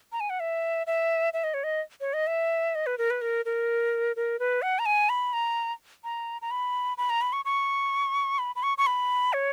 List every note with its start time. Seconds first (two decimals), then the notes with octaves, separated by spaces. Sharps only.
0.12 A#5
0.20 G#5
0.30 F#5
0.40 E5
0.87 E5
1.33 E5
1.44 D#5
1.54 C#5
1.64 D#5
2.01 C#5
2.14 D#5
2.27 E5
2.75 D#5
2.86 B4
2.98 A#4
3.10 B4
3.21 A#4
3.45 A#4
4.16 A#4
4.39 B4
4.62 F#5
4.79 A#5
4.86 G#5
5.09 B5
5.33 A#5
6.04 A#5
6.42 A#5
6.51 B5
6.98 B5
7.10 A#5
7.21 B5
7.33 C#6
7.45 C#6
8.39 B5
8.56 B5
8.63 C#6
8.78 C#6
8.87 B5
9.33 C#5